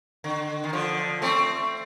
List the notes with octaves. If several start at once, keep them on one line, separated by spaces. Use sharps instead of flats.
D3
D#3
D3 F3
A3 C4